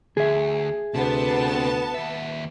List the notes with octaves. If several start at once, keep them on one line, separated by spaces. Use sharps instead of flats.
D2 G#4 E5
D2 C3 B3 A5
D#2 E5